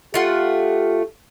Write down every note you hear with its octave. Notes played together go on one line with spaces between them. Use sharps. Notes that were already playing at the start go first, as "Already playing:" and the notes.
A3 F4 G4 F#5